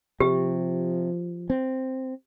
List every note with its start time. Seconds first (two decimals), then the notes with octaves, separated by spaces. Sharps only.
0.20 C3 F3 G4
1.50 C4